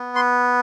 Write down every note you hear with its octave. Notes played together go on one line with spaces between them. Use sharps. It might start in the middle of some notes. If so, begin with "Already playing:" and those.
Already playing: B3
C6